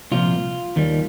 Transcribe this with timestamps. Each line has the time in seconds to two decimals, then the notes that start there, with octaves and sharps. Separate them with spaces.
0.12 C2 A#2 F3 F4
0.76 D#2 D#3 G3